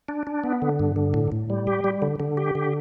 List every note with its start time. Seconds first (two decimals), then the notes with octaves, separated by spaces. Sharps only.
0.09 D4
0.27 D4
0.44 B3
0.62 D3
0.80 G2
0.96 D3
1.14 A2
1.32 A2
1.50 G3
1.67 G4
1.84 G3
2.02 D3
2.20 D3
2.37 G4
2.55 D3